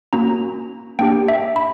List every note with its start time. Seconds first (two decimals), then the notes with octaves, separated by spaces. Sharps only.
0.13 A#3 C#4 F#4 A#5
0.99 A#3 D4 G4 G5
1.28 E5
1.56 B5